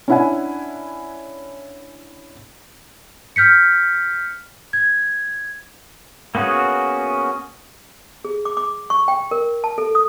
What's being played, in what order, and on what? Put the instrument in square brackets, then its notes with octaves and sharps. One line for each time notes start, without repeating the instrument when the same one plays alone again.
[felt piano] C#4 D4 E4 E5 F#5 G#5
[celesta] F6 G6 B6 C#7
G#6
[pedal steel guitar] A#3 B3 C#4 F#4 G#4
[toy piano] G#4
D6
D6
C#6
G5
A#4
A5
A4
D#6